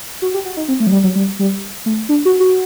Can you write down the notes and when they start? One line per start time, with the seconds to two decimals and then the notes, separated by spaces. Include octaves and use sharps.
0.22 F#4
0.34 G4
0.45 F#4
0.57 D#4
0.68 C4
0.80 A3
0.87 F#3
0.92 G3
1.04 F#3
1.15 G3
1.39 G3
1.86 A3
2.09 D4
2.25 F#4
2.40 F#4